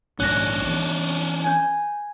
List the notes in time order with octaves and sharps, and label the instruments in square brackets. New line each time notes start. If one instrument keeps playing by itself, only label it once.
[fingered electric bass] A#1 G#2 D#3 [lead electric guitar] C#4 D4 [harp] F#6 A#6
[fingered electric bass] E3 B3
[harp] G#5 G6